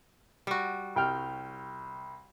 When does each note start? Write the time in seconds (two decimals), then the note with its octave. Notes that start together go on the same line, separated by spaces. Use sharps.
0.47 G3 F#4
0.96 C2 G5 F6